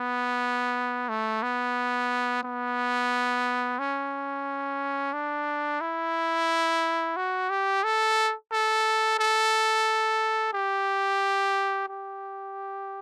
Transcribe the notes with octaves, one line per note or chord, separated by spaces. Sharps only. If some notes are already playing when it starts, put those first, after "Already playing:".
Already playing: B3
A3
B3
B3
C#4
D4
E4
F#4
G4
A4
A4
A4
G4
G4